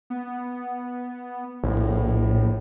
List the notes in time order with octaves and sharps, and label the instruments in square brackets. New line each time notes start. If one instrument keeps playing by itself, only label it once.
[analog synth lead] B3
[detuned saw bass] A#1 [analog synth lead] A2